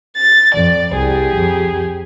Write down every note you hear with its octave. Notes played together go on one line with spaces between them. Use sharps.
A6
F2 D5
C2 G4 G#4
F2